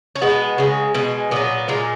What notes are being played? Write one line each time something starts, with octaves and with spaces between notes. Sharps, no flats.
C#4
B2 G#3 B3
C#3 G#3
B2 G#3
A#2 F#3 B3
A#2 G#3 A#3